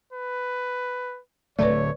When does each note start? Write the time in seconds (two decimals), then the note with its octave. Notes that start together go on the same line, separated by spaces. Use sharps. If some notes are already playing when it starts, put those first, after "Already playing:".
0.13 B4
1.59 D1 D3 A3 B4 C#5 D5